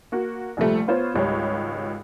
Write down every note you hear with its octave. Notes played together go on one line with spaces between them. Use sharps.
A#3 F#4
A#1 C3 F3 G3 A3
B3 F4 C5 C#5
G#1 C#2 G3 C#5